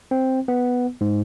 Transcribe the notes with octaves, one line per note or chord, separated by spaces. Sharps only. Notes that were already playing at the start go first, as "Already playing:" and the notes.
C4
B3
G#2